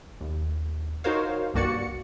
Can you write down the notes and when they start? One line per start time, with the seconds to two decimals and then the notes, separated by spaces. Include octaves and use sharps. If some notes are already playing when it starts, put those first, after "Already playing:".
0.21 D#2
1.04 D#4 F#4 A#4 C5 C#5 F5
1.54 C2 G2 A#3 F#4 D5 C#7